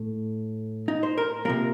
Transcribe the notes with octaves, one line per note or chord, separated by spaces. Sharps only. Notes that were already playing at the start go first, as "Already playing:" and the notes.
Already playing: A2 A3
D#4
C5
A#4
C3 F3 A#3 A#4